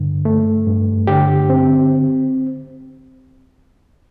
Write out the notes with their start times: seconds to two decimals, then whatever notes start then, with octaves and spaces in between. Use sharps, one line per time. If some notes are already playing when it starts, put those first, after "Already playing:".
Already playing: G2 D3
0.25 A3
0.67 G2
1.07 D3 G4
1.50 C4